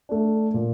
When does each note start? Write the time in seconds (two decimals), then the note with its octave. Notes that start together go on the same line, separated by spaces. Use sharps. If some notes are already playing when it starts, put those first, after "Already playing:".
0.09 A3 D4
0.54 A#2